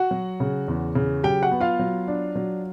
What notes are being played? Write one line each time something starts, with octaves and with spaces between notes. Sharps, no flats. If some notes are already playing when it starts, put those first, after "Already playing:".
Already playing: F#4 F#5
F#3
C#3
E2
C#3
F#3 G4 G5
F#4 F#5
B3
F4 F5
F#3
D4
F#3